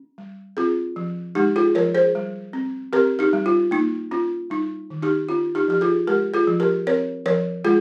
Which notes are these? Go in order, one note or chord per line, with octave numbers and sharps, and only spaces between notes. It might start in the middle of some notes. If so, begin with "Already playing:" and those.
Already playing: C#4
G3
C4 F4 G#4
F3
G#3 D#4 G4
F4 G#4
F3 A#4 C#5
G#4 C5
G3
C4
C4 G4 A#4
D#4 G4
G3
F4
A#3 D#4
C#4 F4
G3 D#4
D#3
D#4 G4
C#4 F4
D#4 G4
F3 G4
F4 G#4
G#3 G4 A#4
F4 G#4
F3
G4 A#4
C4 A#4 C#5
F3 A#4 C#5
G#3 F4 G#4